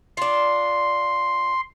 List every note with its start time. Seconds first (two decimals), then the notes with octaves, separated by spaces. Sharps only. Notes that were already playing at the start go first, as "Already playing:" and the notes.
0.17 D4 F4 C6